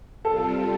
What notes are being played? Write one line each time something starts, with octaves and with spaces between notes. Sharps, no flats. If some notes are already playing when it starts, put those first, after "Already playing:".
C3 G3 C4 F4 A4